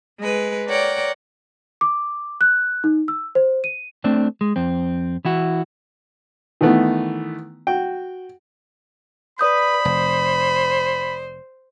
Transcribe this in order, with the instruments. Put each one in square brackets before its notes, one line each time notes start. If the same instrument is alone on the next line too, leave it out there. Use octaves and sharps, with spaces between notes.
[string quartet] G#3 B4
A#4 C#5 D5 F#5 G5
[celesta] D6
F#6
D#4
E6
C5
D#7
[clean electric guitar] A3 C4 D4
G#3
F2 C4
E3 E4 F#4
[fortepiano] D#3 E3 A3 B3
F#4 G5
[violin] B4 [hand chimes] D5 D#6 G6 [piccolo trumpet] B5
[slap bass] F1 [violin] C5